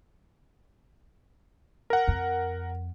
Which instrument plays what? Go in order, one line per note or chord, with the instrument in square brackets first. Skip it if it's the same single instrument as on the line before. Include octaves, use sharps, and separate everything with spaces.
[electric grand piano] A#4 F#5
[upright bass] F2